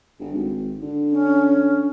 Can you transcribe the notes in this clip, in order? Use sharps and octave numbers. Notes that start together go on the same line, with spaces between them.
G1
G#1
D3
C#4